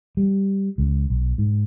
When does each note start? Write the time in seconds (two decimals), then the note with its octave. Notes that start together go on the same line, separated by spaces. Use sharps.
0.17 G3
0.78 C#2
1.10 B1
1.38 G#2